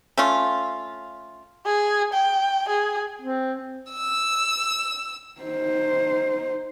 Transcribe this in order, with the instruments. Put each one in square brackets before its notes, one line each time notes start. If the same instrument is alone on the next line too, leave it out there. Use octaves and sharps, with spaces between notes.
[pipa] A3 C#4 F4
[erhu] G#4
G5
G#4
[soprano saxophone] C4
[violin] E6
[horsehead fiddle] D#4 C5